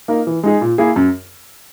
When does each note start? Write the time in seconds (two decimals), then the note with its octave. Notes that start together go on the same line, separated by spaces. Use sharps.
0.08 A#3 D#4 A#4
0.27 E3
0.43 G#3 D#4 G#4
0.61 A#2
0.78 A#3 E4 G#4
0.96 F#2